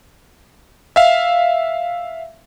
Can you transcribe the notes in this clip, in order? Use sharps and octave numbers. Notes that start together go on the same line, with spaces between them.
E5 F5